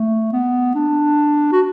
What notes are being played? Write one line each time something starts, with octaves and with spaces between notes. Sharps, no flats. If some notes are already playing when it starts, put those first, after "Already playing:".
Already playing: A3
B3
D4
F#4